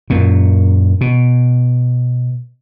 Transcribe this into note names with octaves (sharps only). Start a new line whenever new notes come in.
F#2 A#2
B2